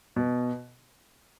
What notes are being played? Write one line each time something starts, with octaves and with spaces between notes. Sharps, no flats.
B2